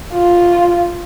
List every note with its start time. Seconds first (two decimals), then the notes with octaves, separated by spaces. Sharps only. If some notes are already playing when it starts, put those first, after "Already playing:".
0.13 F4